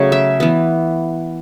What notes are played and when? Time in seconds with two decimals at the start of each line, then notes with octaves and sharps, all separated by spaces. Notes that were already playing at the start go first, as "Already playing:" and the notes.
Already playing: C#3 F#3 A3 C#5
0.12 E5
0.40 E3 B3